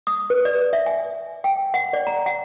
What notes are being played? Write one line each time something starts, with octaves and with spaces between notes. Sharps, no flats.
D#6
B4
D5
E5
G#5
G5
F#5
D5
A#5
F#5